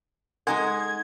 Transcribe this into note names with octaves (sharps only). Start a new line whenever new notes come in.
G#3 D#4 A4 F#5 G#5 C6 G#6